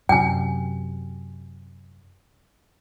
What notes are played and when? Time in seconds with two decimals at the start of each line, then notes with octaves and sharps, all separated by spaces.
0.09 F#2 C3 G5 G#5